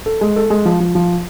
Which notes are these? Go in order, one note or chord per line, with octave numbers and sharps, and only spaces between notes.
A4
G#3
A4
G#3
F3
F3
F3